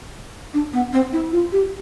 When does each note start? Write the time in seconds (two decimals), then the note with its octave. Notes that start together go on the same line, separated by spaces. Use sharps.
0.53 D4
0.73 B3
0.93 C4
1.12 E4
1.32 F4
1.52 G4